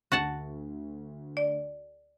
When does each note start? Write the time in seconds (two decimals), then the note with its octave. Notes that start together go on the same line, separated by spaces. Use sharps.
0.12 D2 F#4 F#5 A5
1.37 D5